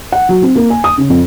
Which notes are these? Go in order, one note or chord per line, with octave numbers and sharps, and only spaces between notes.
F#5
F#3
C4
A#3
G#5
D#6
C#3
F2